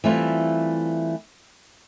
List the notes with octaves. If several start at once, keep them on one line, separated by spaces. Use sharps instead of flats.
E3 G3 A3 C4 E4 F4